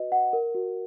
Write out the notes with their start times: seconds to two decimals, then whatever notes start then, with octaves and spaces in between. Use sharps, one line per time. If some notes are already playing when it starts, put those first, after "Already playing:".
Already playing: F#4 B4 D#5
0.12 F#5
0.33 A#4
0.55 F#4